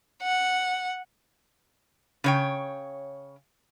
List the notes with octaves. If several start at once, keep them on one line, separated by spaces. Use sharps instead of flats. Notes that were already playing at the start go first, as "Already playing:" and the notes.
F#5
C#3 C#5 G5